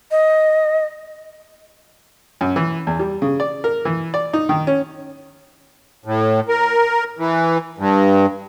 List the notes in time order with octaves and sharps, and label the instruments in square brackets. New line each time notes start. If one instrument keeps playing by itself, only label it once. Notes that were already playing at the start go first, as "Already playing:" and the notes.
[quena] D#5
[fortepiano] F#2
E3
E2
G3
C#3
D5
A#4
E3
D5
D#4
D#3
C#4
[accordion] A2
A#4
E3
G2